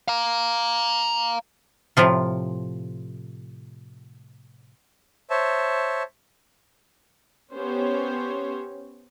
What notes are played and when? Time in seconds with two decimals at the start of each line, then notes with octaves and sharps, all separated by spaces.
0.08 F5 A#5
1.97 A2 C3 F3 F4
5.30 C5 C#5 E5 A5
7.53 B3 C#4 G4 C5 C#5